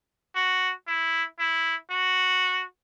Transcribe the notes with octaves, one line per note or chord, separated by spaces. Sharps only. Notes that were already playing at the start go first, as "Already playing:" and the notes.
F#4
E4
E4
F#4